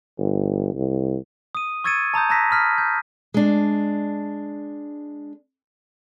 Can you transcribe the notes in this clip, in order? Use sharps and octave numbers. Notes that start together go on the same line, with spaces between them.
G1
C2
D#6 D#7
C#6 E6 G#6 A6 C#7 D#7
A5 A#5 D#6 G6
A5 A#5 E6 F#6 A#6 B6
B5 D#6 F6 B6
G6
G#3 D4